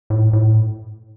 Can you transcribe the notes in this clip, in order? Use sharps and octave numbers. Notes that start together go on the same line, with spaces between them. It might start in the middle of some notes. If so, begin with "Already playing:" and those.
A2
A2